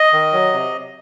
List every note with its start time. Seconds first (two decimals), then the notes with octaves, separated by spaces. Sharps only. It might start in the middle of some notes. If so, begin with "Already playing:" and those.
Already playing: D#5
0.13 D#3
0.33 F#3
0.53 C3